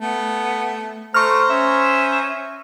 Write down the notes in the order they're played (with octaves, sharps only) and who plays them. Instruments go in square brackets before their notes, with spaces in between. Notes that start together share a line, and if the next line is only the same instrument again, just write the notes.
[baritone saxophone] A3 [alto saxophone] B3
[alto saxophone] A3 [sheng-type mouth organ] C5 A#5 [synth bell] C#6 F6
[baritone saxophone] C#4 [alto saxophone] E5